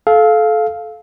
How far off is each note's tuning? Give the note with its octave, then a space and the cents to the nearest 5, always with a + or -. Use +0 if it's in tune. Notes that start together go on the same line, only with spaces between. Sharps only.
A4 -25 F5 +0